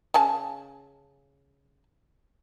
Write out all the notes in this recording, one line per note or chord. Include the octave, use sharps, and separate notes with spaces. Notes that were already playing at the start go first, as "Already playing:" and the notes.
C#3 G#5 A5